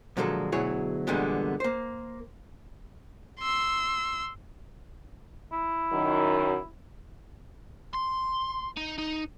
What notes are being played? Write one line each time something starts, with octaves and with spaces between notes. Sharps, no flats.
A#2 D3 F3 F#3 G#3 A4
D2 B2 F#3 E4 G#4 C#5
E2 A#2 D3 G3 G#3 B3
A#3 C5
C6 E6
E4
F#2 D#3
C6
D#4
D#4